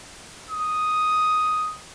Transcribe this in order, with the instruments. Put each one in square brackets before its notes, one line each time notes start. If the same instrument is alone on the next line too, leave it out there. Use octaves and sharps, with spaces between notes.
[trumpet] D#6